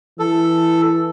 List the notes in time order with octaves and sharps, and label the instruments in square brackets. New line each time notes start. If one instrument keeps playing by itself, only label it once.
[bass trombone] E3 [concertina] A4